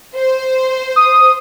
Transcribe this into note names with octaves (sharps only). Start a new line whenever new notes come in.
C5
D#6